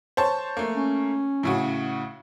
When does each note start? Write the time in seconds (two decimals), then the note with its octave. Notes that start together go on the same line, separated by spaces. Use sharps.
0.17 C5 C#5 A5
0.57 A3 A#3
0.75 C#4
1.43 A2 C#3 F#4